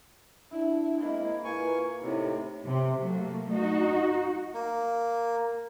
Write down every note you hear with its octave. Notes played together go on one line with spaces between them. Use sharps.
D4 E4
G#3 A#3 C4 E4 D#5
A#2 E4 B4 G#5 C#6
A2 C3 D#4 E4
C3
F#3 A3 A#3
D#4 F#4
A#3